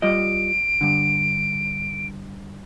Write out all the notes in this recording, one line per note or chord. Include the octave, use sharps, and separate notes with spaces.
G3 F4 D#5 D7
G2 D3